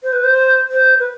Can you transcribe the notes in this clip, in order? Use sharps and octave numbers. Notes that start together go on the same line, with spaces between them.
C5
B4
C5
C5
B4